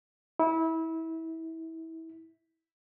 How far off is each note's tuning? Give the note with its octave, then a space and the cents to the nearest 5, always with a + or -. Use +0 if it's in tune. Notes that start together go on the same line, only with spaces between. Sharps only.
E4 -25